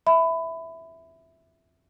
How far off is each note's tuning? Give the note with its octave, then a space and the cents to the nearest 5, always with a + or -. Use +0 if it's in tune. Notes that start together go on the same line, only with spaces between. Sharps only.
E5 -5 B5 +20